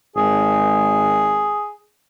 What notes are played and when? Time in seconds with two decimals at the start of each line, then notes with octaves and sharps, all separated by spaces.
0.16 G#1 G#4